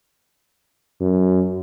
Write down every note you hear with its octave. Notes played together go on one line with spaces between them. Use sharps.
F#2